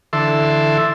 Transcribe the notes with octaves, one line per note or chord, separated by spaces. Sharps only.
D3 E3 A4 E5 C6